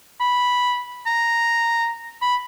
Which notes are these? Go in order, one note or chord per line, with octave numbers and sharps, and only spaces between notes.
B5
A#5
B5